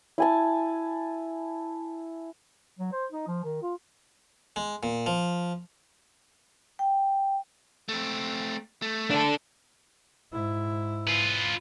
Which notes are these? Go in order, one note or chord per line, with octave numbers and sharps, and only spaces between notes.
E4 G#5 A5
F#3
C5
D#4
F3
D#3
F4
G#3
A#2
F3
G5
A3 C4
A3
D4 A4
G#2 E4
F4 B4